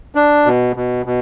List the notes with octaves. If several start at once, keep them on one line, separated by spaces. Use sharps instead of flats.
D4
B2
B2
B2